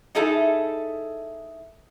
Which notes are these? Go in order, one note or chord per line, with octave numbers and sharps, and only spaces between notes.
D#4 E4 G#4 A4 E5